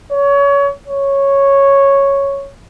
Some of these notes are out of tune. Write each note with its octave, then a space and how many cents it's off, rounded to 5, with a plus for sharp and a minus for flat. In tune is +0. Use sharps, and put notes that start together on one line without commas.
C#5 +25
C#5 -5